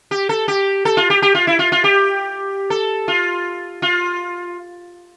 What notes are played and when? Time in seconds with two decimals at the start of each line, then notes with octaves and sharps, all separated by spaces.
0.11 G4
0.29 A4
0.48 G4
0.85 A4
0.97 F4
1.10 G4
1.22 G4
1.35 F4
1.47 E4
1.59 F4
1.72 F4
1.84 G4
2.70 A4
3.08 F4
3.82 F4